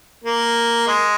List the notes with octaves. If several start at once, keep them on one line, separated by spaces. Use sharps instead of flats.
A#3
G#3